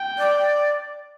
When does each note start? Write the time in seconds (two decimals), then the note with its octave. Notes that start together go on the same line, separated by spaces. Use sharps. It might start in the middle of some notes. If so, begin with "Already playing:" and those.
Already playing: G5
0.18 D5